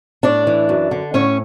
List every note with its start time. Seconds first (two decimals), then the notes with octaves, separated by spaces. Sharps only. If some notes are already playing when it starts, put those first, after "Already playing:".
0.23 A2 D4 D5
0.47 E3
0.69 F#2
0.91 D3
1.14 A2 C#4 C#5